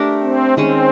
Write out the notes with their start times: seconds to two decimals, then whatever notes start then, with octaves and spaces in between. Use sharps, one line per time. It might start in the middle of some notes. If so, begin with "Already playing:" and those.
Already playing: A3 D4 G4 A#4
0.22 C4
0.57 D#3 G#3 C4 C#4